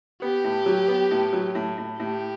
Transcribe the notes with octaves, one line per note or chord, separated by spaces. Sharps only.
B3 G4
A2
F#3
B3
A2
F#3
A2
A2
A2 G4